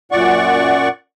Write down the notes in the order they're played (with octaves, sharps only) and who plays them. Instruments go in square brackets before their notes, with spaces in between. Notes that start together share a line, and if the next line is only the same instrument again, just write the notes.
[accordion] F#2 A#2 D5 F#5 C#6